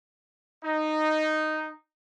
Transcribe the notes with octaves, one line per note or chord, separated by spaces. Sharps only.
D#4